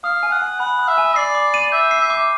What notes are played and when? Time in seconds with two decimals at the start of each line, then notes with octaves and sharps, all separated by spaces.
0.04 F5 D#6
0.23 G#5
0.32 F#5
0.41 G#5
0.60 F#5 B5
0.79 D#6
0.88 E5
0.98 G#5
1.16 D5 C7
1.35 D6
1.54 D#7
1.72 E5 G6
1.91 C7
2.00 E5
2.10 D6